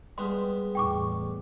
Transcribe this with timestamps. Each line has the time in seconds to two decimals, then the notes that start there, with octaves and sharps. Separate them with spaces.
0.18 G3 G#3 B3 C6
0.75 E2 A2 G5 C#6 D6